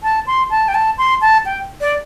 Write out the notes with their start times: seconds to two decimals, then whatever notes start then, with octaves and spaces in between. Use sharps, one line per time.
0.03 A5
0.27 C6
0.50 A5
0.68 G5
0.74 A5
0.98 C6
1.21 A5
1.46 G5
1.81 D5